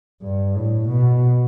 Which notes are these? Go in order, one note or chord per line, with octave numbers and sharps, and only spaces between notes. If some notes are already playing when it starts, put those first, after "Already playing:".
G2
A2
B2